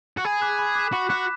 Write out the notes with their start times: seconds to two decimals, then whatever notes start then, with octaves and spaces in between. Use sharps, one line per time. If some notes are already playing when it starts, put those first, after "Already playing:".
0.17 F#4
0.25 G#4 B5
0.41 D6 F#6 B6 E7
0.59 B5
0.75 D6 F#6 B6 E7
0.92 F#4 B5
1.09 F#4 D6 F#6 B6 E7